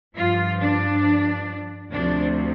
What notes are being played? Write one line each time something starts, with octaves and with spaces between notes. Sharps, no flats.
G2 F3 F4
D4
D2 C3 F3 D4